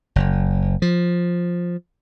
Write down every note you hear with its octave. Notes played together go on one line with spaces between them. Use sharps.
F#1
F3